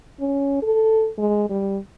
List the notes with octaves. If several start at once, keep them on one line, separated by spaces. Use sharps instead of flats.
C#4
A4
G#3
G3